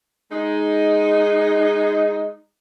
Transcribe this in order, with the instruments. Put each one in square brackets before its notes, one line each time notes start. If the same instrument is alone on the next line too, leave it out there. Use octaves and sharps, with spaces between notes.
[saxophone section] G#3 D#4